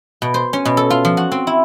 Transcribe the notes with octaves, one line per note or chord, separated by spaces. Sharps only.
B2
C5
C#4
B2
A4
F4
F3
F#4
C4
E4